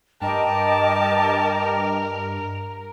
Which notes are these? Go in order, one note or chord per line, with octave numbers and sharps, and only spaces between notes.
G2 A#4 D#5 G5 A5 D6